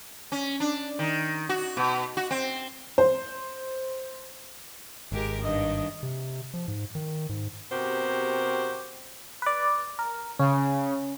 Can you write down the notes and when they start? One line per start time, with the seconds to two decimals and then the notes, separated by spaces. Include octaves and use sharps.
0.32 C#4
0.60 D4
0.99 D#3
1.49 F#4
1.77 B2
2.17 F#4
2.31 C4
2.98 C5
5.12 G#1 G#3 G4 A#4
5.42 G2 D#3 D#5
6.03 C3
6.54 F3
6.68 G#2
6.95 D#3
7.29 G#2
7.72 C3 B3 F#4 G4 A#4 C5
9.42 B4 D5
9.99 A#4
10.39 C#3 C#4